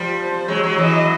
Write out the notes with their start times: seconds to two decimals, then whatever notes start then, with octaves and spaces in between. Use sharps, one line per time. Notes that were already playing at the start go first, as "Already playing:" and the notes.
Already playing: F3 G3
0.19 C5
0.48 F#3 G#3 C#5
0.64 F#3 G#3
0.78 E3 F#3 D#5